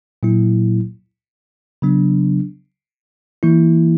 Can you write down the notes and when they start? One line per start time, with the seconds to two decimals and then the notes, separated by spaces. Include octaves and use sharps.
0.23 A#2 F#3 A#3 E4
1.82 C#3 F#3 B3 D4
3.43 E3 A#3 E4